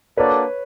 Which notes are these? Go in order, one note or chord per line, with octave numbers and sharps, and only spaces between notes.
A#3 D4 F#4 A4 B4 C#5 D5